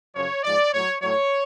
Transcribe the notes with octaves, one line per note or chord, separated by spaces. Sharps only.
F#2 C#3 F3 C#5
G#2 F3 D5
A2 F#3 C#5
A2 F#3 C#5